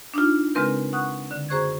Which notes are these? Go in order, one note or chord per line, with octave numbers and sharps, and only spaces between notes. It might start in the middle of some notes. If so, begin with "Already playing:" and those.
D4 D#4 F4
C#3 G#3 C4 A#4 B4 G6
F#5 C#6 D#6 F#6
D3
F#2 G#4 C5 C#6 F#6 G#6